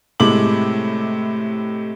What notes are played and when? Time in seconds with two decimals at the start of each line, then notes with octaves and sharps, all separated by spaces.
0.20 A2 C3 G#3 E4 D6 F#7